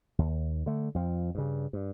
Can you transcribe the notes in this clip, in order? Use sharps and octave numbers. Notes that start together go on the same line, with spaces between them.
D#2
D3 A3
F2 F3
G2 C#3
G2